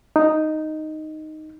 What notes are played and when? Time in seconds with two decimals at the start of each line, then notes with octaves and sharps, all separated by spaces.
0.16 D#4